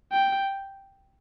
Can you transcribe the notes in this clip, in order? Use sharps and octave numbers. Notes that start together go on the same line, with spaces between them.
G5